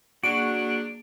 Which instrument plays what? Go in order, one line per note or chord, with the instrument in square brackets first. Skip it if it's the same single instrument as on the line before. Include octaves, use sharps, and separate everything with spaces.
[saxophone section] F#3 D4 [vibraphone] A#3 G#4 [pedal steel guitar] F#4 [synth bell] D7